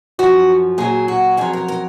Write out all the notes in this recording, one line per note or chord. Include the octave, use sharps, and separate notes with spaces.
F#2 F3 F#4
A#2 F#3 G#4
F#4
F2 D#3 F#3 G#4
A#4
A#4